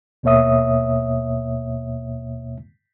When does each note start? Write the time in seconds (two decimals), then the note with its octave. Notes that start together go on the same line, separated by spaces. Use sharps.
0.23 D#2 B2 A#3 C#5 E5 D#6